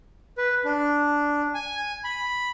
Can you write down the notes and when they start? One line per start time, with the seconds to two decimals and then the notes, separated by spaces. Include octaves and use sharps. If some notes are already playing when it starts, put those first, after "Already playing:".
0.38 B4
0.64 D4
1.54 G#5
2.04 B5